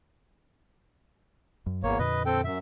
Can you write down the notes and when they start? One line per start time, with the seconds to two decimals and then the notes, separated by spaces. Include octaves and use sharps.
1.66 F#2
1.83 G#1 E2 A#3 C#5
1.99 F2 A#2 D3 B4 D#5
2.26 C4 A4 G5
2.44 F#2 E5